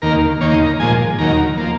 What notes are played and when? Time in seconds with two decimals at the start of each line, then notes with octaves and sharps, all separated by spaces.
0.02 D#2 D#3 A#3 A#4
0.41 D#2 D#3 A#3 C#5
0.54 D#5
0.67 A#5
0.80 A#2 F3 G#3 G#5
1.19 D#2 D#3 F#3 A#5
1.57 F3 A#3